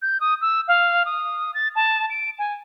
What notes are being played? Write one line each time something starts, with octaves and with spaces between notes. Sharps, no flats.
G6
D#6
E6
F5
D#6
A6
A5
D7
G#5